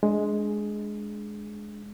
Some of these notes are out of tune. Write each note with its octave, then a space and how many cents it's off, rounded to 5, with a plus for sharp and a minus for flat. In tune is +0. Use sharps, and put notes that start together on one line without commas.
G#3 +10 D4 +0